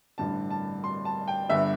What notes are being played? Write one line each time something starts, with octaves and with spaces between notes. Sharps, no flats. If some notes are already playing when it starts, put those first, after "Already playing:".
A1 G2 D3 A5
A5
C6
A5
G5
G1 G2 D3 E5